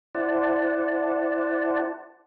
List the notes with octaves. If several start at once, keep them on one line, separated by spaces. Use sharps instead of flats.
E4 C5 D5 F#5 A5